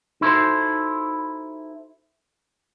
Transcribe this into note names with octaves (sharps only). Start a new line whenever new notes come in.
D#4 E4 F#4 A4 C5